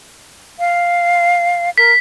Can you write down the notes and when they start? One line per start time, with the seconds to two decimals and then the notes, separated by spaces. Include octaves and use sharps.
0.59 F5
1.78 A#4 B6